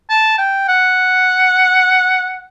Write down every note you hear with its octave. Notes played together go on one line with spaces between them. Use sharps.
A5
G5
F#5